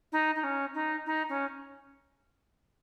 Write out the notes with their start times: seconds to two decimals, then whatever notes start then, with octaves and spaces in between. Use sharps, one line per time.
0.12 D#4
0.35 D#4
0.43 C#4
0.74 D#4
1.06 D#4
1.29 C#4